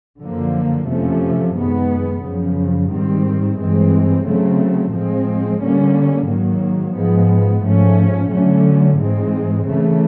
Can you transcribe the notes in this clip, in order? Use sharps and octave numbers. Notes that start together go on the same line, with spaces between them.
F#2 D3 F3 A#3
F2 C3 F3 A3 C#4
F#2 D#3 G#3 B3
F#2 C#3 F3
G#2 D#3 G3 C4
G2 E3 G#3 C4
C#3 F#3 A3 C4
A2 F3 G#3 C4
D3 G3 A#3 C#4
G#2 D#3 F#3 A#3
G#2 F3 G#3 B3
G#2 F3 A3 C#4
D3 F#3 A3 C#4
G#2 E3 G#3 C4
C#3 E3 A3